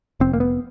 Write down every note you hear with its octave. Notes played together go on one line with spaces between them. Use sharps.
F1 C4
A#3
B3